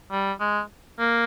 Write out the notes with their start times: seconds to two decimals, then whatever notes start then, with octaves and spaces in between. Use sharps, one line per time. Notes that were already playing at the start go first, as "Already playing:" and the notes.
0.12 G3
0.40 G#3
0.99 A#3